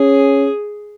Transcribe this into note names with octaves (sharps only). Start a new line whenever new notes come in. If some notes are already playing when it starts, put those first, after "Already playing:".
Already playing: C#4 G#4